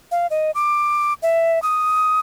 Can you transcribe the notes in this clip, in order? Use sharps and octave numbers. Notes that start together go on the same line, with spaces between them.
F5
D#5
D6
E5
D#6